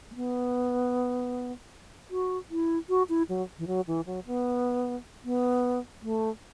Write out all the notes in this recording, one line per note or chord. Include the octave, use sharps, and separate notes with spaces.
A3
B3
F#4
E4
F#4
E4
F#3
E3
F#3
E3
F#3
B3
B3
A3